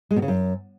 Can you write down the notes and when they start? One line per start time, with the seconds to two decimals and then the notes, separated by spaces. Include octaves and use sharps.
0.11 G#3
0.16 B2
0.22 C#3
0.28 F#2